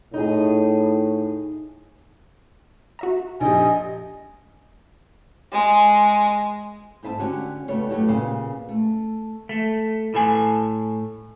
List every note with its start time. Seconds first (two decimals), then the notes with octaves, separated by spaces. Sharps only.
0.14 A2 D#4 G#4
2.99 F#4 E5 A#5
3.41 A#1 G4 D#5 G#5
5.52 G#3
7.03 G#2 C4 E5 G#5 A5
7.18 D3 C#4 F#4 G4 G#5
7.68 C#3 G3 A3 B3 C#5
7.89 G2 F#3 A3 E4 G4
8.08 A#2 C#3 G3 B3 F5 G#5
8.68 A3
9.49 A3
10.14 A2 A4 G#5